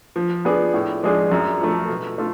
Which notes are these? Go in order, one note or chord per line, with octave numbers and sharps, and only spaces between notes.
F3
B3 D4 G#4
A2
F3 G#3 D4 G#4
F#2
F3 A3
B2
A3 F4